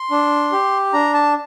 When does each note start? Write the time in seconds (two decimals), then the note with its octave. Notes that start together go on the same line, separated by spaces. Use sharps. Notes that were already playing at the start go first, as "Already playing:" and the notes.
Already playing: C6
0.11 D4
0.52 G4
0.93 D4 A#5
1.14 A5